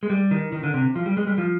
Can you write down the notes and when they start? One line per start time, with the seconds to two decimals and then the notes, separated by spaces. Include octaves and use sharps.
0.03 G#3
0.10 G3
0.31 D#3
0.52 D#3
0.63 D3
0.74 C3
0.96 F3
1.06 G3
1.17 G#3
1.27 G3
1.38 F3